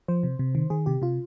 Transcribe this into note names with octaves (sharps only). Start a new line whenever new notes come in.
F3 C5
C3
C3
D#3
D#3 G#4
C3 G4
C3 F4